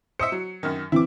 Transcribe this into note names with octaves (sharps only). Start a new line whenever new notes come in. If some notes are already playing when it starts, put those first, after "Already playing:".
C5 D#5 E5 C#7
F#3
F#2 D#3
E3 C4 E4 D6